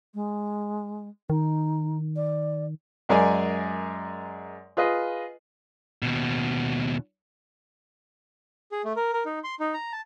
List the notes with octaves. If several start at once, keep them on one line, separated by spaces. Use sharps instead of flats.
G#3
D#3 D#4
D5
F#2 G#3 A#4 D5 G#5
F4 G#4 B4 D#5
D#2 B2
G#4
A3
A#4
A#4
D#4
C6
D#4
A#5
A5